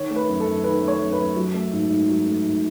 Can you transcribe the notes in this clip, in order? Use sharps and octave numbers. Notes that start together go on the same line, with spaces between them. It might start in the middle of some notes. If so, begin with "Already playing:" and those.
Already playing: D#3 C#5
A3
B4
F#2
A4
F#2
D#3 B4
A3
C#5
F#2
B4
F#2
F#3
A3
G#2
G#2
F#3
A3
G#2